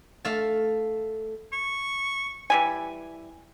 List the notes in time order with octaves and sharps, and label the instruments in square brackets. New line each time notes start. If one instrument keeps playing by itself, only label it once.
[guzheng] A3 F5 A5
[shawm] C#6
[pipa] E3 G3 G#5